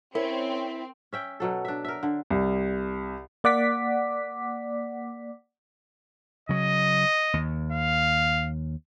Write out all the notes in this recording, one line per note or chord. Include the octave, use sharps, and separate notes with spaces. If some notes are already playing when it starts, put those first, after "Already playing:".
C4 C#4 E4 A#4
C#4 E5 G5
B2 F#3 A4
D4 E5
A#4 E5
D3
C2
A#3 D5 F#5 D6 B6
C#3 F#3 D#5
D#2
F5